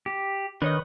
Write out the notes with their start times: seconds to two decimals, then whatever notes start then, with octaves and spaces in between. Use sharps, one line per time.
0.06 G4
0.62 D#3 D4 B4 C#5 D#5